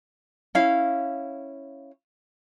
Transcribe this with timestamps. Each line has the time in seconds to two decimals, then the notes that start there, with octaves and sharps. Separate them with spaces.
0.55 C#4 E4 F5